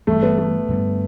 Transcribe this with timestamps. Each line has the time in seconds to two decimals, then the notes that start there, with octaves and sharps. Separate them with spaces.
0.07 G1 G2 E3 G3 A3
0.23 B3
0.38 A3
0.69 G2 D3 G3 B3